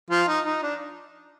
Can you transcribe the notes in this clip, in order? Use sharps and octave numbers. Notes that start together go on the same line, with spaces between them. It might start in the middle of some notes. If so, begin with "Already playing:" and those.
F3 F4
D#4
D#4
D4